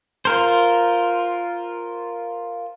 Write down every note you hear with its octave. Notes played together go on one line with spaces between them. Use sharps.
F4 A#4 C5